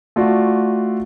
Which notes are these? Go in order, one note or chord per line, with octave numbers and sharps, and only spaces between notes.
A3 F4 F#4 D5